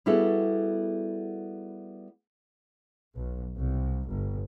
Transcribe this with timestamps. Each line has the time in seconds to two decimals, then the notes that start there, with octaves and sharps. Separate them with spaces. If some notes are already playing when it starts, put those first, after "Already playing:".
0.06 G3 B3 E4 F#4 G#4 A4
3.15 B1
3.57 C2
4.11 G1